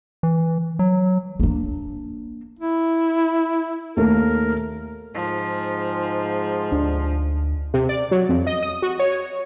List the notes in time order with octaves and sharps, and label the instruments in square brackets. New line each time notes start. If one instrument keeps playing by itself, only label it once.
[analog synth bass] E3
F#3
[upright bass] A#3 D4
[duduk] E4
[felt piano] D#2 A3 [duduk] A#4
[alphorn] G#2 [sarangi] F3
[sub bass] D2 [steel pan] D4
[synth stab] C3
D5
F#3
F2
D#5
D#6
F#4
C#5